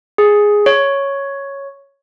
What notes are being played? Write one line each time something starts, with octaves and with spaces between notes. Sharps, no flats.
G#4
C#5